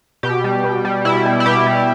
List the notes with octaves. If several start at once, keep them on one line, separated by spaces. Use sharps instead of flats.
B2 G4
G3
B2
G3
B2 E4
G3
E4
B2 G4
G3